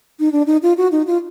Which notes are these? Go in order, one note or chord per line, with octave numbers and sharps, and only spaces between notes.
D#4
D4
D#4
F4
F#4
D#4
F4